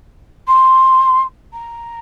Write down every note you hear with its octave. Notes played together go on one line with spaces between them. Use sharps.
C6
A#5